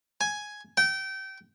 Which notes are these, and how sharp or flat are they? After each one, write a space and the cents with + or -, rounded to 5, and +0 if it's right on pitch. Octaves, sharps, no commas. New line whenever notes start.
G#5 +5
G5 -25